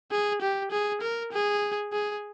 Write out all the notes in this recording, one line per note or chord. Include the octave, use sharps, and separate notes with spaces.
G#4
G4
G#4
A#4
G#4
G#4